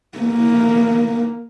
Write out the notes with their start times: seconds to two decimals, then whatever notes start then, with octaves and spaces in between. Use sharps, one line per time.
0.18 A#3